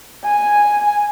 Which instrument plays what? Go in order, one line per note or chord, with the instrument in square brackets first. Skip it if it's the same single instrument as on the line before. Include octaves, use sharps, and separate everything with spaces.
[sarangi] G#5